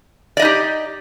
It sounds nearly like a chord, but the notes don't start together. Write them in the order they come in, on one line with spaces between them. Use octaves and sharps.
D5 D#5 D#4 G4